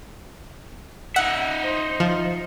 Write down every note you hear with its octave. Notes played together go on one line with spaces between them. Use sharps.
D#4 E5 F#5
C5
F3